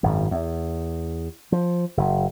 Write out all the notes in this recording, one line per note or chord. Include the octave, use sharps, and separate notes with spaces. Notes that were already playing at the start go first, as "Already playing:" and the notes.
G#1 F#2
E2
F3
F#1